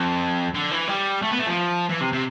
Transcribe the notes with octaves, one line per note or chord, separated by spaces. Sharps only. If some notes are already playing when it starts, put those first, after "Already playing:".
Already playing: F2
D3
E3
G3
A3
B3
A3
F3
E3
C3
C3